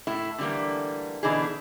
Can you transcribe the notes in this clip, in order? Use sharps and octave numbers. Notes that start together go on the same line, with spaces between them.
A2 A3 E4
D3 E3 G3 A3 A#3
B2 D3 E3 D4 D#4 G#4